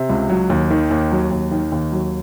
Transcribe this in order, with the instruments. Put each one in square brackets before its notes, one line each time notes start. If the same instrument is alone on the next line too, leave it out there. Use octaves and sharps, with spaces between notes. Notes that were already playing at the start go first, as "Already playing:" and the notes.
Already playing: [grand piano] C3
C#2
F#3
D#2
D#3
D#2
F#3
D#2
D#3
D#2
F#3